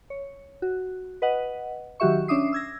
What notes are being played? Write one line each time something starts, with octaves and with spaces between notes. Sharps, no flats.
C#5
F#4
B4 D#5 F#5
D#3 F#3 F#4 G4 E5 C#6
C#4 D4 E5 D6 D#6 C7
E6 G#6 A#6